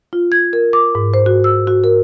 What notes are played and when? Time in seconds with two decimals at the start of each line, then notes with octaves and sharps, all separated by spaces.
0.13 F4
0.32 G#6
0.53 A#4
0.73 D6
0.95 G#2
1.14 C5
1.26 F#4
1.44 E6
1.67 F#4
1.84 A#4